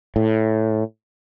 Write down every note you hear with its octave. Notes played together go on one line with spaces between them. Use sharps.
A2